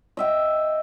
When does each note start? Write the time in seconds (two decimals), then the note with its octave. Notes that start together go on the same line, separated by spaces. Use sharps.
0.17 D#5 E5 G5